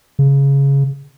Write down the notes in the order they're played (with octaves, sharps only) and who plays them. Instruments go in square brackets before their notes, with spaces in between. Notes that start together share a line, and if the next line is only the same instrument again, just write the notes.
[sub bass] C#3